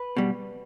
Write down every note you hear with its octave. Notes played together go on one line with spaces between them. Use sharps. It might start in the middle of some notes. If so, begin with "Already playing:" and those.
Already playing: B4
B2 G3